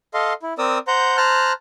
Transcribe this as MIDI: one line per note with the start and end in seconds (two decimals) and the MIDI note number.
0.14 0.33 69
0.14 0.33 75
0.14 0.33 77
0.14 0.33 84
0.42 0.54 64
0.58 0.78 60
0.58 0.78 70
0.58 0.78 74
0.58 0.78 87
0.58 0.78 88
0.88 1.17 72
0.88 1.17 78
0.88 1.17 82
0.88 1.17 91
1.17 1.53 72
1.17 1.53 81
1.17 1.53 82
1.17 1.53 89
1.17 1.53 90